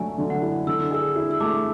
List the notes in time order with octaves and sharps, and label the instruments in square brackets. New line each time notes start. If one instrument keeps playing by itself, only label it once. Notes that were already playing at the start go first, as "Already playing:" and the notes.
Already playing: [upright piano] D3 F#3 A3 [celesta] C#5 D5 E5 G#5
[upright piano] D3
[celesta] F#5
[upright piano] E4
[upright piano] D3 [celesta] E6
[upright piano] G#4 [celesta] E6
[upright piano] E4
[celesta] E6
[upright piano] A3 [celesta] D6